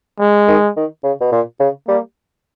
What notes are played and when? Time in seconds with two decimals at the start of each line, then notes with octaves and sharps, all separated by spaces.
0.20 G#3
0.48 D#3
0.77 D#3
1.03 C#3
1.21 B2
1.32 A#2
1.60 C#3
1.88 G3 A#3